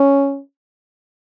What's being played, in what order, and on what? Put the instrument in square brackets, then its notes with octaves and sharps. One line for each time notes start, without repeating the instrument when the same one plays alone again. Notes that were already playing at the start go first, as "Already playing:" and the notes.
Already playing: [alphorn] C#4